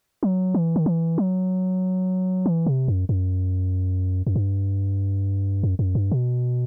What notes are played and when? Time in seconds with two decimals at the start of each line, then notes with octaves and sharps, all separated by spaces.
0.23 F#3
0.55 E3
0.76 D#3
0.86 E3
1.18 F#3
2.46 E3
2.66 C3
2.88 F#2
3.09 F#2
4.27 F#2
4.36 G2
5.63 F#2
5.79 F#2
5.95 G2
6.11 B2